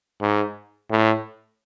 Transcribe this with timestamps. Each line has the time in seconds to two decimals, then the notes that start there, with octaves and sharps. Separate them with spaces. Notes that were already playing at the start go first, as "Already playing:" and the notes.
0.22 G#2
0.91 A2